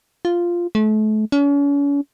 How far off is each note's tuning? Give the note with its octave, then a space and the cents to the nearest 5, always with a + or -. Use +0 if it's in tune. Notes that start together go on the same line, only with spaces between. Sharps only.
F4 -5
A3 -35
C#4 +40